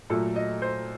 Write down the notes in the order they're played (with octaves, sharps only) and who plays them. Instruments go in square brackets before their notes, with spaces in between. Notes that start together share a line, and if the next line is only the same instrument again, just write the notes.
[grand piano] A#2 F#3 A3 A4
D#5
C5